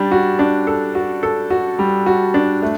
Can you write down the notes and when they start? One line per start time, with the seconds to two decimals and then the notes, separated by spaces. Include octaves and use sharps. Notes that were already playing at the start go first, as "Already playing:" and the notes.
Already playing: G3 D4
0.11 F#4
0.39 D4
0.67 A4
0.95 F#4
1.23 A4
1.50 F#4
1.79 G3
2.06 F#4
2.34 D4
2.62 A3